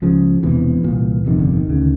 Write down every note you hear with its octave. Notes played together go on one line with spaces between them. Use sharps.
C#2 C#3 F3
E1 E2 C3 E3
C2 A#2
G1 F2 C3 D#3
D3
D#3
D2 C#3